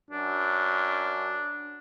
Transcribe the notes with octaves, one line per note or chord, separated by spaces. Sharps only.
F#2 D4